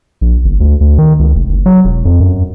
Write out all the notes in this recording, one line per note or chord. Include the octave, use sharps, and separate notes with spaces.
A#1
F#1
D2
D2
D#3
C#2
F1
F#1
F#3
E1
F2
F#2